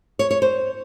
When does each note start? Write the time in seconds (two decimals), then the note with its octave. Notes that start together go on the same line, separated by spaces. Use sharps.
0.19 C#5
0.31 C#5
0.42 C5